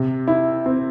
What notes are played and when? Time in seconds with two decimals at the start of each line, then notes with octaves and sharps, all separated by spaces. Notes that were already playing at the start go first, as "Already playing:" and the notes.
Already playing: C3
0.28 E4
0.66 C4